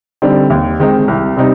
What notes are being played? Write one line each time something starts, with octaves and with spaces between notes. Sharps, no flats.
D3 G3 C4 D#4
D#2
D#3 G#3 C4 D#4
C2
C3 G3 C4 D#4